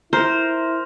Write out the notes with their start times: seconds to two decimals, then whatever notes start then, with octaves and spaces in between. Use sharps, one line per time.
0.13 E4 A#4 C5